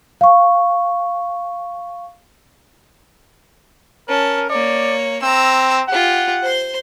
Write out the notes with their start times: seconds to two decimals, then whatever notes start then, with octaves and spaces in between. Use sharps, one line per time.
0.21 F5 C#6
4.08 C#4 A#4 A5
4.50 A#3 C#5 D5
5.22 C4 A#5 E6
5.88 F4 G4 F#5
6.43 C5 C6